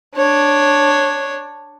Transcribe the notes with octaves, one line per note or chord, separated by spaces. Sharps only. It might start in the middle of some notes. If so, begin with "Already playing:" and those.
D4 C#5